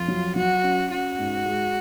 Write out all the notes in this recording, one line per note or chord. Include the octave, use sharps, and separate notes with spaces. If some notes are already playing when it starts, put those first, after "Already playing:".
Already playing: F2 F4
F#3
F#3 F#4
C#4
C#4 F#4
G#2
G#3